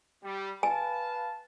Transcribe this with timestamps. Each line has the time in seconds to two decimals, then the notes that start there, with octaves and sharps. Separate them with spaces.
0.24 G3
0.63 B4 F5 G#5 A5